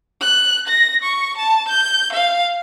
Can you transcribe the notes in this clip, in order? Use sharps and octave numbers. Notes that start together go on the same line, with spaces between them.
F#6
A#6
C#6
A5
G6
F5